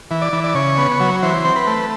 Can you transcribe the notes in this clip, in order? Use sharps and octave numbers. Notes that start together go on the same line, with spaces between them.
E3
D5
E3
D5
C#3 C#5
B3
F#3
E3 C5
C4
B4
A3